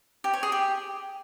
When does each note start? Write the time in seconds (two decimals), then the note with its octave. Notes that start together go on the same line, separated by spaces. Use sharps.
0.24 G4
0.33 C#5
0.43 G#4
0.52 G4